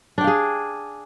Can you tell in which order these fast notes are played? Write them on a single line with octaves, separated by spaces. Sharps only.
D4 G5 F5 G#4